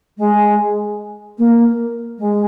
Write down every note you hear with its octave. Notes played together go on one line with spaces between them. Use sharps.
G#3
A#3
G#3